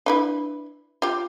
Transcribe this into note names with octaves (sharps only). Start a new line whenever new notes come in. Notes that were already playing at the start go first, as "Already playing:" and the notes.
D4 E4 B4
F4 G4